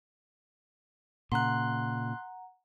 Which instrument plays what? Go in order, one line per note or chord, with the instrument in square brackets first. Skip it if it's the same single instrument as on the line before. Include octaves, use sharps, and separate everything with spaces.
[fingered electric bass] A#2 C#3 [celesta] F#5 A#5 [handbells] C6 F#6